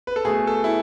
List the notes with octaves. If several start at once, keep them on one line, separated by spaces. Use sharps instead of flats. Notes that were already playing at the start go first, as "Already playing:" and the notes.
B4
A4
B2 A3 G#4
A4
E4